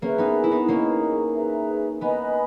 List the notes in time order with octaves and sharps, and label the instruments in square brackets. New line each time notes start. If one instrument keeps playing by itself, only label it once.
[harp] A#3 C#4 [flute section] G#4 B4 E5 G#5
[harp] B3 D#4
E4
B3 D#4
[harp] A#3 C#4 [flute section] G#4 B4 D#5 A#5
[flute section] G#4 B4 E5 A#5
[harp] B3 D#4 [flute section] B4 D#5 G#5 B5